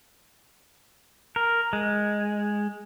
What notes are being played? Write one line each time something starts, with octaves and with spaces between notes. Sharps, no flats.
A#4
G#3